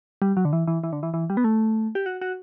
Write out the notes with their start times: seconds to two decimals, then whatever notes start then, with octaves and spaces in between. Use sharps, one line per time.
0.22 G3
0.37 F#3
0.45 D3
0.53 E3
0.67 E3
0.83 E3
0.93 D3
1.03 E3
1.14 E3
1.30 G3
1.37 B3
1.44 A3
1.95 G4
2.06 F#4
2.21 F#4